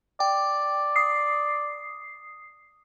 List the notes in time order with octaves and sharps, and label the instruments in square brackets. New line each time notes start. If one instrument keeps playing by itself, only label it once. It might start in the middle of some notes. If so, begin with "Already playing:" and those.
[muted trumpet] D5 [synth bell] G5
[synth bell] D#6 C7